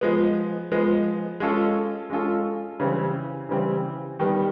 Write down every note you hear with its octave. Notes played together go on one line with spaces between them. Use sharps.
F3 G#3 B3
F3 G#3 B3
G#3 C#4 F4 A4
G#3 C#4 F4 A4
C#3 E3 G3 C4
C#3 E3 G3 C4
D#3 G3 B3